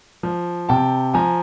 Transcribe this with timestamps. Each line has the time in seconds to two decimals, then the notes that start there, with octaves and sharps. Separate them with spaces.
0.23 F3
0.69 C3 G5 A5
1.14 F3 G#5 A#5